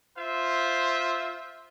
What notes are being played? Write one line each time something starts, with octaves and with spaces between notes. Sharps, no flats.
F4 C5 E5